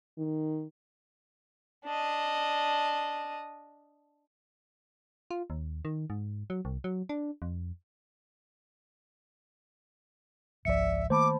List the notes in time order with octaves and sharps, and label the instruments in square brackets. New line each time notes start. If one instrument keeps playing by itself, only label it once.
[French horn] D#3
[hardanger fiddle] D4 D#5
[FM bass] F4
D#2
D#3
G#2
F#3
C2
F#3
D4
F2
[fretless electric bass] G#1 C#2 F3 [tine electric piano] D5 C#7 [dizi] E5
[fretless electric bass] D#3 A3 A#3 [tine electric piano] C5 A5 B5 [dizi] D6